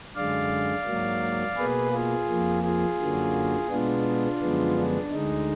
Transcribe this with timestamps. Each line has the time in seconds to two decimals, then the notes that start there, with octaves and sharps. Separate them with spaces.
0.16 F#2 D3 G#3 D5 F5
0.87 G#2 F#3 A#3
1.57 B2 A#3 G#4 B4
1.92 F4 G#4
2.29 F2 F3 A#3
2.63 F4 G#4
3.00 F#2 D3 F#3 A#3
3.70 B2 G#3 B3 D4 F4
4.41 F#2 D3 F3 G#3 B3
4.77 D4
5.12 D2 D3 G#3 D#4